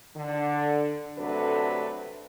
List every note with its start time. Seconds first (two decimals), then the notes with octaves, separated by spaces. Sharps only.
0.16 D3
1.18 C3 F#3 A3 D4 A4 B4